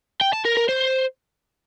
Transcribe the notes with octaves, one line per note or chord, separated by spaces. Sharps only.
G5
A5
A#4
A#4
C5